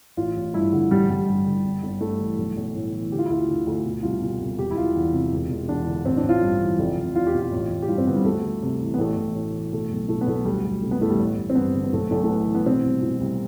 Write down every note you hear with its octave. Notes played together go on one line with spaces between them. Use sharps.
A1 F4
A1
G2 E4
D3
A1 G3
A1 G3
G2
D3
G1
G1
G2 A3
E3
B1
B1
A2
E3
D3 G4
F4
E4
D2 F4
D3
D2
B2
C2 F4
B2
C2
E1 G4
E4
E1 F4
E2
C3
E1
E1
E2 D4
D3
A1 C4
D4
A1
F4
G2
E3
F1
F1
E2 F4
G4
B2
F4
A1
A1
G4
G2 F4
C4
D3 B3
G3
D2 A3
D2
C3
E3
B3
A1 A3
A1
A2
E3
B2 A3
B1
B2 A3
B3
B1 A3
D2 G3
D2
C3 A3
B3
E3 A3
G3
A1
A1
C4
G2 B3
D3
B3
B1 A3
B1 A3
A3
A2 B3
E3
B3
B2 C4
C2
B2
C2